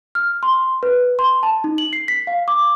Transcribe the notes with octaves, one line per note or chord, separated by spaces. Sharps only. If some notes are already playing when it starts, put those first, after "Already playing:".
F6
C6
B4
C6
A5
D#4
F#7
C7
B6
F5
D6